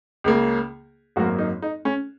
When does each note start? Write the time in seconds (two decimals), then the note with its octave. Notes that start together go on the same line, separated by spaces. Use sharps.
0.24 C#2 C#3 A#3
1.16 G#1 F#2 F#3 A#3 F#4
1.38 D#4
1.62 D#4
1.85 C#4